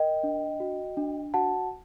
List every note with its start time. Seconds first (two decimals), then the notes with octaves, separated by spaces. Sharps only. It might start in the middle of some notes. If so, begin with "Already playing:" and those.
Already playing: A#4 D#5 G5
0.23 D4
0.60 F#4
0.97 D4
1.34 F#4 F#5 A5